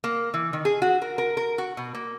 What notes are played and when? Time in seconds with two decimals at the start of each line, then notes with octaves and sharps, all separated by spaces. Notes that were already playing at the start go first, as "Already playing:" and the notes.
0.04 A#3
0.34 E3
0.53 D#3
0.65 G#4
0.82 F#4
1.02 A#4
1.18 A#4
1.37 A#4
1.58 F#4
1.77 B2
1.95 A#3